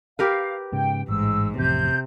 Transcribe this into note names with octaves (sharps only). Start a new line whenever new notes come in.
G4 A#4 B4 F5
G#2 C#3 G5
A1 G#2 E6
A1 F2 C3 G6